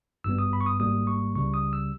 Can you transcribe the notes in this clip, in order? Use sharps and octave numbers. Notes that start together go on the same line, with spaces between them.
G#1 G2 G3 B3 E6
D#6
B5
C#6
D#6
G#1 G#2 G3 A#3 D#6
C#6
C#2 C#3 G3 C#6
D#6
E6